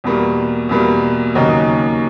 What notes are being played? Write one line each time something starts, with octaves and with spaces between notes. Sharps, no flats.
E2 B2 G3 A#3
E2 B2 G3 A#3
D#2 C#3 F#3 A#3 D#4